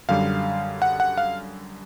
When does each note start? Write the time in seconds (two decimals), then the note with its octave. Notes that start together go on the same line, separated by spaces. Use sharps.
0.09 F#2 D3 G3 F5
0.82 F#5
1.00 F#5
1.18 F5